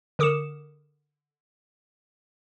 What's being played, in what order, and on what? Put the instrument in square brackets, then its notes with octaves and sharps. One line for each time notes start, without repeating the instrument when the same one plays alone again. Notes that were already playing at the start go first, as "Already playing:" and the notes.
[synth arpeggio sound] D3 A#4 D6 D#6 C#7 E7